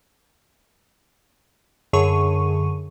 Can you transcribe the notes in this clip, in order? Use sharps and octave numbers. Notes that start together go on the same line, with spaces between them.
F#2 D3 G#4 C#5 C#6 D#7